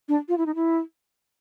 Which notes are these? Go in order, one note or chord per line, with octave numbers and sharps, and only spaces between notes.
D4
F4
E4
D#4
E4